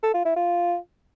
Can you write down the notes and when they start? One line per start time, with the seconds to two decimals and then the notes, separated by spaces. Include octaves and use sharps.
0.03 A4
0.14 F4
0.25 E4
0.36 F4